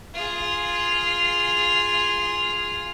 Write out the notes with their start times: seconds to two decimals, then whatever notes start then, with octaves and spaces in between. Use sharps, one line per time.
0.14 F4 G#4